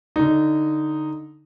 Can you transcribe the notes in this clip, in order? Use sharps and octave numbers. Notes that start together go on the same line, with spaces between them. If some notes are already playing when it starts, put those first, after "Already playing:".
D3 D#4